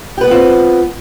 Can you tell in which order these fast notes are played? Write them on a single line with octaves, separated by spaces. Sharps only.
G4 B4 B3 F4 C4